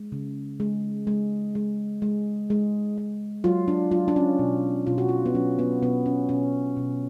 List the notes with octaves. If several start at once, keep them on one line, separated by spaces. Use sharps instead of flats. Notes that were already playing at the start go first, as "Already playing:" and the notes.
Already playing: G#3
C#3
G#3
G#3
G#3
G#3
G#3
G#3
F#3 F4
D4
F#3 F4
D4
C#4
B2
B2 F4
F#4
F4
B3
F#3 C#4
B3
B2 B3
C#4
B2 C#4
B2